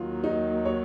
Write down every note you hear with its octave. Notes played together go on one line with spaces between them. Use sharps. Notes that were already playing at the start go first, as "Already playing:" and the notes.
Already playing: D#2 D#3 F#3 F4
D#4
C#5